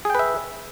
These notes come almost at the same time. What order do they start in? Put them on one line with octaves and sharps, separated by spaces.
G#4 G5 B4 E5